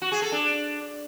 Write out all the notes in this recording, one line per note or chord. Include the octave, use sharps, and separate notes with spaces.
F#4
G#4
A4
D4